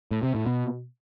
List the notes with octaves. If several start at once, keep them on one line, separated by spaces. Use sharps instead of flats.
A2
C3
A2
B2